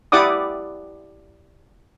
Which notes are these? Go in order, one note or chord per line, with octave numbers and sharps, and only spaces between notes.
E4 G4 D5 F#5 D6 D#6